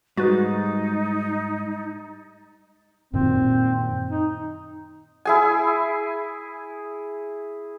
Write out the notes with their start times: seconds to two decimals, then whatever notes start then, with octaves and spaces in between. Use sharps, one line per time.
0.17 G#2 G3 D#4 F#4 B4 A6
3.13 F#2 A#2 D#3 C4
4.10 D#4
5.25 E4 G#4 G#5